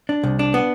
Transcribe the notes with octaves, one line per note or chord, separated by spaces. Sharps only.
D4
C2
D4
B3